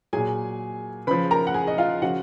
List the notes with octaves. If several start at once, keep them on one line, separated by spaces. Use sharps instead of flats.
A#2 F#3 G#4 G#5
C#3 F3 B4 B5
A#4 A#5
F#5
G#4 G#5
D#5
F4 F5
C#3 F3 F#4 F#5